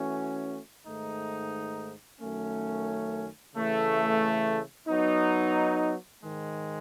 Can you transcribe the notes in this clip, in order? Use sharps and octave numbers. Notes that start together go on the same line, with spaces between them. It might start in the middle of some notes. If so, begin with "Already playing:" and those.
Already playing: E3 A3 C#4 F#4
G#2 D#3 A3 D#4
F#2 D#3 A3 C#4
C#3 E3 A3
F#3 B3 D#4
G#2 D#3 G#3